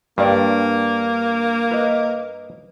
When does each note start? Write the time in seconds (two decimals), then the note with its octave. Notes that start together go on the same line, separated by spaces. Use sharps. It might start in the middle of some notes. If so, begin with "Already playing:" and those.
0.18 G2 A#3 D4 D5 G5
1.71 B4 D#5